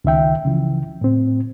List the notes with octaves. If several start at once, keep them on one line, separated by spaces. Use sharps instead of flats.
C#2 D#3 E5 G5
C#3 E3 F3
A2 C4